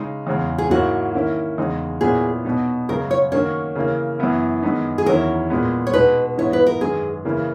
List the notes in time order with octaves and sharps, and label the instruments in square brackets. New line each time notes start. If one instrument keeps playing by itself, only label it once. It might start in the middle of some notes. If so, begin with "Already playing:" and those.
Already playing: [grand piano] C#3 G#3 D#4
E2 C#3 G#3
[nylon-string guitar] G#4
[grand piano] G#2 F#3 A#3 E4 [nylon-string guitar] F#4
[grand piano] D#3 A#3 C#4 E4
E2 C#3 G#3 D#4
[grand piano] A#2 F#3 B3 E4 [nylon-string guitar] G#4
[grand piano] B2 F#3 B3 D#4
[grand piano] F#2 C#3 G#3 [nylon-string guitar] A#4
[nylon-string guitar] C#5
[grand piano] D#3 F#3 A#3 C#4 [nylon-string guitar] C#5
[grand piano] C#3 E3 A#3
F#2 E3 B3 E4
F#2 D#3 G#3 B3 D#4
[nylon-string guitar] G#4
[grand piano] E2 D#3 F#3 C#4 E4 [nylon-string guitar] A#4
[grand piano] A#2 G#3 B3
[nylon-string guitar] C#5
[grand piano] B2 G#3 D#4 [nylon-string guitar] B4
[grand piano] G#2 E3 B3 E4 [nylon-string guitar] C#5
[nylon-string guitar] B4
A#4
[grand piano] F#2 D#3 G#3 [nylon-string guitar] G#4
[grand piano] C#3 E3 A#3 E4